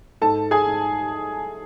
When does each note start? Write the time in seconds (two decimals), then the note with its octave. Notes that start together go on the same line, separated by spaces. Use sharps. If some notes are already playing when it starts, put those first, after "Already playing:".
0.22 G#2 A4 A5
0.51 G#4 G#5
0.67 G#2